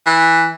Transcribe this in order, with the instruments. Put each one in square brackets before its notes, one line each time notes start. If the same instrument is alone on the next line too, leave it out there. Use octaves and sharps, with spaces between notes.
[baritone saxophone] E3